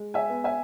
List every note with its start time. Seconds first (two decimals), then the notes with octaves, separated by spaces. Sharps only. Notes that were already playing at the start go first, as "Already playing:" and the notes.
Already playing: G#3
0.14 E5 G#5
0.30 B3
0.44 E5 G#5